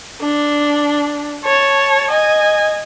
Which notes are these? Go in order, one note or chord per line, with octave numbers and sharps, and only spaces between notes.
D4
C#5 A5
D#5 G#5